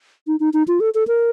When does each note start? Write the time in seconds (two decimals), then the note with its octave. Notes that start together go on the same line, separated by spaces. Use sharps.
0.27 D#4
0.40 D#4
0.54 D#4
0.68 F4
0.80 A4
0.95 A4
1.07 A#4